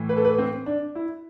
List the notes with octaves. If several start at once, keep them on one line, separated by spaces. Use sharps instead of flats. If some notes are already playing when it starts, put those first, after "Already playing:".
Already playing: A2 E3
B4
A4
B4
C4
D4
E4